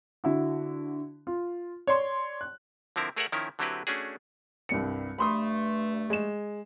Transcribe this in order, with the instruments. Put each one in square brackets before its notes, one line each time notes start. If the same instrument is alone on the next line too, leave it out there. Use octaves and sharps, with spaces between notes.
[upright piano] D3 E4 F#4
F4
C#5 D5 C6
F#6
[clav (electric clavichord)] D3 F3 C4 E4 A#4
A3 G#4 A#4 C#5 E5 F#5
D#3 F3 C#4 E4 A#4
D3 F#3 C4 E4 G4 B4
A3 C#4 D4 F#4 G#4
[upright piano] C2 G2 C#7
[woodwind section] G2 A3 [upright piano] B5 C6 D#6
[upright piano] G#3 E7